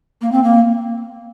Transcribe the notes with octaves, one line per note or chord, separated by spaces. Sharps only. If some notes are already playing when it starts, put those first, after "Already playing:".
A#3
C4
A#3